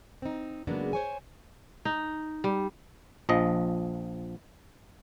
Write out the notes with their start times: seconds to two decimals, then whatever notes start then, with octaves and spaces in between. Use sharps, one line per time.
0.22 C4 D#4
0.67 C#3 F#3 G#3 A#3 B3 D4
0.93 C5 C#5 G#5
1.85 D#4
2.44 G3
3.29 A#1 F3 D#5